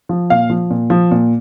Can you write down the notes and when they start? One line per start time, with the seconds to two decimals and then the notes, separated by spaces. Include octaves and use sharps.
0.09 F3
0.30 A#2 F5
0.50 F3
0.70 A#2
0.90 F3
1.11 A#2